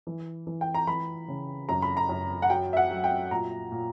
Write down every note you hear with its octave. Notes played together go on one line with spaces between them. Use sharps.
E3
E3
G5
A#5
E3 B5
C#3
F#2 A#5
B5
A#5
F#2
F#5
F#3 G5
E5
F#5
F#3
G5
A#2 A#5
A#2